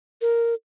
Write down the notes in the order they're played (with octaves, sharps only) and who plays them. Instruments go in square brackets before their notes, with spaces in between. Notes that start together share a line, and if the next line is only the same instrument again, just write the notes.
[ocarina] A#4